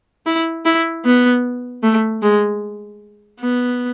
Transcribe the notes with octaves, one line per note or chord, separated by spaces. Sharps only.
E4
E4
B3
A3
G#3
B3